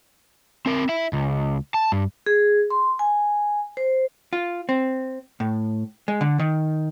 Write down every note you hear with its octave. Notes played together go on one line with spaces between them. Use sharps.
C4 A#4
E4 E5
C#2
A5
G2
G#4
C6
G#5
C5
F4
C4
A2
G#3
D3
D#3